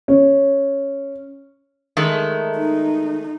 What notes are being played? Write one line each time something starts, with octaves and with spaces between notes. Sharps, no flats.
C#4
D#3 G#3 A3
D#4